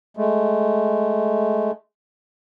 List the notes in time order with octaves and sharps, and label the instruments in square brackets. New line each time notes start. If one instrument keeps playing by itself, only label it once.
[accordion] G#3 A3